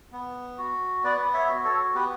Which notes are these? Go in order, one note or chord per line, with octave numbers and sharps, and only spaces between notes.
B3
F#4
B3 B4 D5
C#5 E5
F#4
A4 C#5
B3 G4 B4